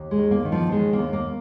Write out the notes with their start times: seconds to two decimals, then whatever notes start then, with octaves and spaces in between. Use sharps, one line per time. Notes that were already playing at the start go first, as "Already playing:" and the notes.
Already playing: D#2
0.11 G#3
0.18 D#3
0.31 A#3
0.45 D#3
0.52 F3
0.72 D#2 G#3
0.93 A#3
0.99 D#2
1.13 A#3